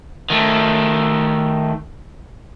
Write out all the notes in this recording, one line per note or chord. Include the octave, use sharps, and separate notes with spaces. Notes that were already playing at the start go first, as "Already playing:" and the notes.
D#3 A3